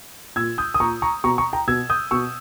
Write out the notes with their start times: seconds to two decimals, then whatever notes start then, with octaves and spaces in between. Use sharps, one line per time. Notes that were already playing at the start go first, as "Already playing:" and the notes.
0.36 A#2 E6 G#6
0.58 D#6 G6
0.74 D#6
0.80 A#2 A#5 C#6
1.02 A#5 C#6
1.24 B2 A#5 C#6
1.38 A#5 C#6
1.53 G5 A#5
1.67 B2 E6 G#6
1.90 D#6 G6
2.11 B2 C#6 E6